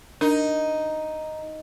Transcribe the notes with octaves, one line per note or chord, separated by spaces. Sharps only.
D4 D#4 A#4